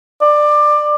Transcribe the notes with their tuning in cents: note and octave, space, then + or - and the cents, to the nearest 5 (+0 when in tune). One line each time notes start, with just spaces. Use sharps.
D5 +20